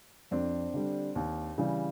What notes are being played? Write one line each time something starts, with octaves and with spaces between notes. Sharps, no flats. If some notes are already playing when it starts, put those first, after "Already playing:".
F2 C4 D4
D3 G3
D#2
C#3 E3 G3